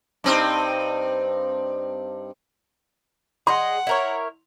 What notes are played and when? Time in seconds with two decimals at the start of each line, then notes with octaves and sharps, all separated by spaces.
0.24 G2 C4 D#4
3.47 G#4 D#5 F#5 C6
3.87 E4 A#4 C#5